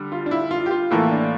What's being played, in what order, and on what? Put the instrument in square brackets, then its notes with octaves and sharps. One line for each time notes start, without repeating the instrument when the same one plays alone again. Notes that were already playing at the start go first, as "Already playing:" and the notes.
Already playing: [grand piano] D3 G3
[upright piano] F4
D4
E4
F4
G4
F4
[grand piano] A2 E3 A#3 F4 A4 [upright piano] E4
[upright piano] D4